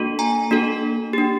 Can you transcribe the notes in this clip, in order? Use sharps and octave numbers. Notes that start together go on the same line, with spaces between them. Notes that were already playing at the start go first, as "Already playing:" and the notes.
Already playing: A#3 D4 F#4 A4
G#5 A#5
A#3 D4 F#4 A4
D4 G4